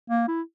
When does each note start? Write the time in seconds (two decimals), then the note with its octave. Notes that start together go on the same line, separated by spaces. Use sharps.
0.10 A#3
0.28 E4